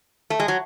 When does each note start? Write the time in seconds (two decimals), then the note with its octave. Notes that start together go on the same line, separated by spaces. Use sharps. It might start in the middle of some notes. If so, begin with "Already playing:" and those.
0.30 A3
0.40 G#3
0.48 F#3